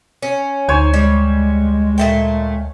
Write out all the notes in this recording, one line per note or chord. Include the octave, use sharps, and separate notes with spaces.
C#4
D2 D#4 C5 C#5 G#5
G3 G#3
A#2 A3 G5